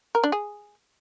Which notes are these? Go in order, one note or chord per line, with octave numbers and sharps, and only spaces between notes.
A#4
D4
G#4